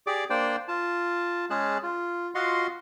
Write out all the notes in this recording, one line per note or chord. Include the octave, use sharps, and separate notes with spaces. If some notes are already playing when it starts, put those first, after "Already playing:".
G4 G#4 D5 D6
A#3 D4 C5 D5 G5
F4 A5
G#3 C#4 G#4 A5 F#6
F4
F4 F#4 D#5 F5 F#5 C6